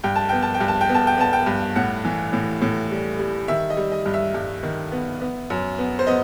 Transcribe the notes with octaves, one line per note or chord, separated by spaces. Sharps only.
G2 G5
A5
B3 G5
A5
G5
G2
A5
G5
B3
A5
G5
B3 A5
G5
G2
A2 F#5
E3
A2
A2
G3
G3
D#3 E5
D#5
G3
D#5
G2
E5
G2
D#3
B3
B3
F#2
B3
C5
B3 D#5